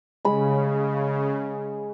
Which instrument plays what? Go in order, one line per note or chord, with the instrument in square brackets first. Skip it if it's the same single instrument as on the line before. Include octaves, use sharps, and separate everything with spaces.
[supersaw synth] C#3 [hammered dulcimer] G#3 B5